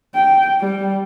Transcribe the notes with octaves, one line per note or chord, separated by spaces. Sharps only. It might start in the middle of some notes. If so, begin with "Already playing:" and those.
G5
G3